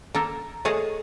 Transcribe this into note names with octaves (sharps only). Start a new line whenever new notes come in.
A#3 A4 A#4
A3 G#4 C#5 D#5 A5